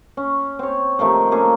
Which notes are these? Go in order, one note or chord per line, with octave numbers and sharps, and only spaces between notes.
C#4
C4 C#5
C3 D#3 F3 A3
A#3 C#4 G#4 A4